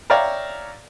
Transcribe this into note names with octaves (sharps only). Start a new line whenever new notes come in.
C#5 D5 E5 F5 G5 A#5